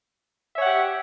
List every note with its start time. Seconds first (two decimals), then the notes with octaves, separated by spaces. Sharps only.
0.55 E5
0.59 C#5
0.62 F#5
0.66 G4